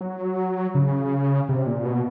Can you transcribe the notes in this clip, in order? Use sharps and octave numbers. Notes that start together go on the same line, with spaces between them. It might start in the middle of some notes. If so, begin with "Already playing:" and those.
F#3
C#3
C3
A#2
B2